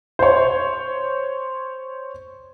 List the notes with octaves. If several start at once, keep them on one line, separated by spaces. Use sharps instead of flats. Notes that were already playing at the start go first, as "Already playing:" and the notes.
C5 C#5